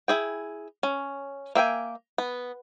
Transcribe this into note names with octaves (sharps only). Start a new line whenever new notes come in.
E4 G#4 G5
C#4
A#3 E5 G5 G#5
B3